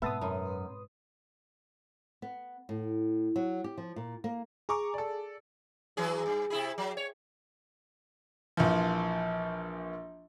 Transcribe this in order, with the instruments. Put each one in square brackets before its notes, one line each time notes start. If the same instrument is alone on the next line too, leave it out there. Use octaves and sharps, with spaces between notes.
[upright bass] G#2 B2 [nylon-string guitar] B3 [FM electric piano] B4 C6 D#6 [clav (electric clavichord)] E5 A5
[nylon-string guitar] F#2
B3
A2
F#3
G4
F3
A#2
A#3
[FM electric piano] G#4 [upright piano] A#5 C#6 D6
[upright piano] A4 D5
[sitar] E3 F#3 G#4
G2
C3 E4 G#4
F#3
C#5
[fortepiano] A#1 E3 F3